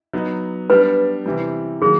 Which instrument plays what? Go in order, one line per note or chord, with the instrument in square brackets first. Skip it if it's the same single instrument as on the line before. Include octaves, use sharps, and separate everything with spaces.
[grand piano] F#3 B3 D#4
[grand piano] G3 B3 D4 [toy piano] B4
[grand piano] C3 E3 G3
[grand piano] D#3 F#3 A#3 [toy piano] G#4